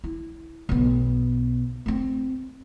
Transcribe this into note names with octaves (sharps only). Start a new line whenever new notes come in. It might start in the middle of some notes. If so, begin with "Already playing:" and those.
E4
B1 B3
A3 C4